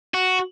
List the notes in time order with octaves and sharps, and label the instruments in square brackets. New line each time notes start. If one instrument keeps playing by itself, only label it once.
[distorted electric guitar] F#4